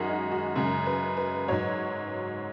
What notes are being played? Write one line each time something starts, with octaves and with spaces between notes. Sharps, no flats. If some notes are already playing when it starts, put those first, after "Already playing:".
Already playing: F#2 D#3 G#3 F#4 G#4
D#4
F#4
F#2 C#3 G#3
B4
B4
G#2 F#3 C#5